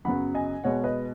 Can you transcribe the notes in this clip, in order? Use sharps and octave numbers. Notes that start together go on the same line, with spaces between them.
F#2 C#3 F#3 B3 F#5 B5
D#5 G#5
B2 G#3 B3 C#5 F#5
B4 D#5